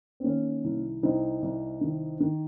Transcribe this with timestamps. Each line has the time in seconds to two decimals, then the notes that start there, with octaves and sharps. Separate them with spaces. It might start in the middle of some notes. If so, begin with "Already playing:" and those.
0.20 C4
0.24 D#3 A#3 C#4
0.64 C2
1.03 C2 C4 D#4
1.42 C2
1.81 D#3
2.20 D#3